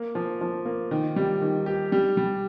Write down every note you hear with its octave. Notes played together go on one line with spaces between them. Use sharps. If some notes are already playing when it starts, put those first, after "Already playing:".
Already playing: A#3
F3
F3
A#3
D#3
G3
D#3
G4
G3
G3